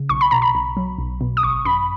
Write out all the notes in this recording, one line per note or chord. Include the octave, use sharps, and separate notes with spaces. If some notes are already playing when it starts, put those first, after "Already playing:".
Already playing: C#3
B1 C#6
B5
B2 A#5
B5
B1
F#3
B1
B2
D#6
G#1 C#6
F#2 B5